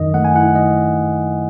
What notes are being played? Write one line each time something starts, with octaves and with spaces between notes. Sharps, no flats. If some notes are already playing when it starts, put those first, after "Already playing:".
Already playing: F#2 D#3 D#5
A3 F#5
G#5
E4 F#5
D#3 D#5